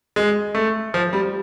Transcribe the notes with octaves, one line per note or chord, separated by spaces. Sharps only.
G#3
A3
F3
G3